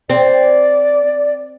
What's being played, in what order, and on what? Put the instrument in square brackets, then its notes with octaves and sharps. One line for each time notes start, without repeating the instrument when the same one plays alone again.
[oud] C4 [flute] D5